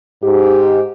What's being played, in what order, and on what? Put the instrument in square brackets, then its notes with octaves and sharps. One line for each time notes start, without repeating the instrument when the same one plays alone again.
[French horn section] G#2 G4